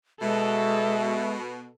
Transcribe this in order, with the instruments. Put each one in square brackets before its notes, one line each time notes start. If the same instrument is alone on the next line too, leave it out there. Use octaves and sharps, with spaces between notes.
[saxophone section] B2 [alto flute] G#3 [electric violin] A4 [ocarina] E5